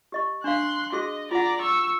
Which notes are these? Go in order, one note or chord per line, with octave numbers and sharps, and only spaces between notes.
G4 D#5 C#6
D4 F5 C6 F#6
F#4 G#4 D#5 C6
F4 D5 F#5 A#5
C#6 E6